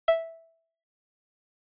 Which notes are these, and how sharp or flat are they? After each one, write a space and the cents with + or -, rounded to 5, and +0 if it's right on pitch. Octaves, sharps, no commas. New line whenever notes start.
E5 -5